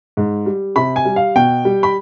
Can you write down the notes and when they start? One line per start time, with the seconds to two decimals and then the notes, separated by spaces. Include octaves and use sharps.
0.17 G#2
0.46 G3
0.76 C3 B5
0.96 G#5
1.05 G3
1.16 F5
1.36 B2 G5
1.65 G3
1.83 B5